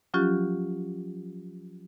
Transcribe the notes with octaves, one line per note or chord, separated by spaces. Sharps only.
F3 F#3 C#4 F4 G4 F#6